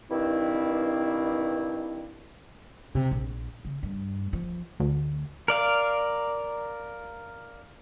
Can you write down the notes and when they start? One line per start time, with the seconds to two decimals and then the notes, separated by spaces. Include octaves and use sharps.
0.10 G2 B2 D#3 C4 E4
2.95 C3
3.11 A#1
3.65 C#3
3.83 G2
4.33 F3
4.80 D2
5.48 A#4 D5 F5